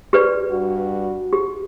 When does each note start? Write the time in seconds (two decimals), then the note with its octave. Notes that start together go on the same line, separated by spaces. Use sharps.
0.13 G4 B4 D5
0.49 G2 G3 F#4
1.33 G4